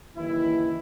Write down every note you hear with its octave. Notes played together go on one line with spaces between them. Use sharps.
F#1 D#2 D#3 E3 E4